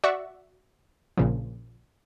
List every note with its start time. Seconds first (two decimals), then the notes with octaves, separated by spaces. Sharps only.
0.04 F#4 D5 E5 F#5 C#6
1.17 A#1 A#2 C#3 F3